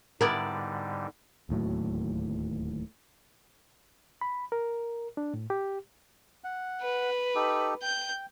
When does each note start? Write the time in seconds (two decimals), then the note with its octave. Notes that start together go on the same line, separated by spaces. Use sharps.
0.21 G#2 D3 G3 B3 E4 A#4 D5
1.49 D1 D#2 A2 F#3
4.21 B5
4.52 A#4
5.17 D4
5.34 A2
5.50 G4
6.44 F#5
6.82 B4
7.35 D#4 G4 A4
7.82 G5 G6